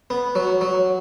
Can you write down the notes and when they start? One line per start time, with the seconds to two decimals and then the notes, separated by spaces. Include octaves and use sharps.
0.10 B3
0.35 F#3
0.61 F#3